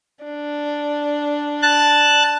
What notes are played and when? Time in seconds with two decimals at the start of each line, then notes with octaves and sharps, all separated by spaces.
0.24 D4
1.62 A5 F#6